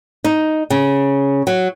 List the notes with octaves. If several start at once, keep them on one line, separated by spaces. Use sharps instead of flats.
D#4
C#3
F#3